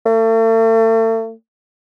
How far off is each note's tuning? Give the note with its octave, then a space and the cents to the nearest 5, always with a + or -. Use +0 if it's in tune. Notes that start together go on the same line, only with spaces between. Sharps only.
A3 +40